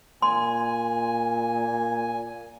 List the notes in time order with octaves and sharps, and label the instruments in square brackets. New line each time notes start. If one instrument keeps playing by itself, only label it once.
[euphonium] A#2 [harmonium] G#5 [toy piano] C6